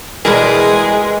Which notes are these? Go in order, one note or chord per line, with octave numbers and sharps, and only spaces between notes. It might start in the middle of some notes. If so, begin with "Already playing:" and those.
B2 E3 G3 G#3 G#4 A#4 B4